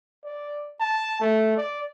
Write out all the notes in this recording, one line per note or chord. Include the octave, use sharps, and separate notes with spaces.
D5
A5
A3
D5